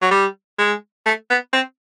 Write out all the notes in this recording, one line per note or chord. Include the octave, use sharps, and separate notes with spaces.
F#3
G3
G#3
A3
B3
C4